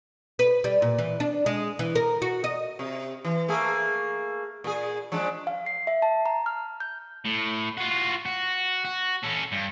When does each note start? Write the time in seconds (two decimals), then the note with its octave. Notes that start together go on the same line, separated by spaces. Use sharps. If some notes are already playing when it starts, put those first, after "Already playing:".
0.39 B4
0.64 G3
0.82 A#2
0.98 E3
1.20 D4
1.46 G#3
1.79 E3
1.95 A#4
2.22 F#4
2.44 D#5
2.79 C3
3.25 E3
3.48 A3 A#3 G#4
4.64 A#2 G#4
5.12 F3 G#3 D4
5.47 F5
5.66 C7
5.87 E5
6.02 A5
6.26 A#5
6.46 F6
6.80 G6
7.25 A2
7.78 F4 F#4
8.26 F#4
8.85 F#4
9.23 C#4 A4
9.52 G2